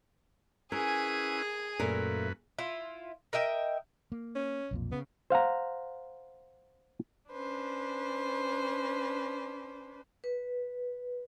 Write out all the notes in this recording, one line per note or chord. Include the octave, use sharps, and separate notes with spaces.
C#4 E4 G#4 A#4 B4 G#5
F#2 A#2 A3 A#4 B4
E4 F4
A#4 D#5 E5 G5
A#3
C#4
B1 F2 A#2
C#3 B3
C5 F5 F#5 A#5
C#4 D4 B4 C5
B4